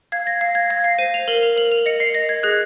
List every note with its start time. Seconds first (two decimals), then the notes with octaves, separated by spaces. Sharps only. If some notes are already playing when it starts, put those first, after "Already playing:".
0.12 F5 G#6
0.27 A#6
0.41 F5
0.55 G#6
0.70 F5 A#6
0.84 C7
0.98 C5 D#7
1.14 F7
1.28 A#4 F#7
1.43 F7
1.57 A#4 F#7
1.72 F7
1.86 D#5 C#7
2.00 C7
2.14 D#5 A#6
2.29 G#6
2.43 G#4 F#6